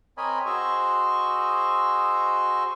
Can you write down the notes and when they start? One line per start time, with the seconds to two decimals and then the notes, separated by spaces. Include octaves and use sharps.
0.17 C4 A#4 C#5 D#5 G#5 B5
0.46 F#4 G#4 C5 D#5 C#6 E6